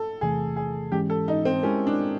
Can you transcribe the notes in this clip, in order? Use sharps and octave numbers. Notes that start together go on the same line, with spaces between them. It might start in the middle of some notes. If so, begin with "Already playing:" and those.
Already playing: A4
E2 C3 E3 A3 G#4
G#4
G#2 E3 G#3 C#4 G4
A4
D#4
C4
G#3 C4 C#4 E4 G4 A#4
D4